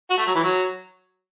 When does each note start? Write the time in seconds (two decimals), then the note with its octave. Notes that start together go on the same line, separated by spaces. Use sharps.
0.10 F#4
0.18 A3
0.27 F#3
0.35 E3
0.43 F#3